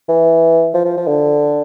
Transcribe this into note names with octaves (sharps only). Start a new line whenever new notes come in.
E3
F3
F3
F3
D3